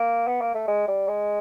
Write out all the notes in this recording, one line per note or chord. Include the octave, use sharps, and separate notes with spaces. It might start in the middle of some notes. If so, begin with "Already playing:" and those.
Already playing: A#3
B3
A#3
A3
G#3
G3
G#3